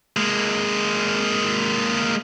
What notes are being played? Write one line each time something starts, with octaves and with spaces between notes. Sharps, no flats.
G#3 A#3